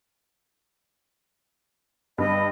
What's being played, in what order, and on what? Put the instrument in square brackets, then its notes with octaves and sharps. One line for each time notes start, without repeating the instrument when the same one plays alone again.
[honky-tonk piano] G2 [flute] D#5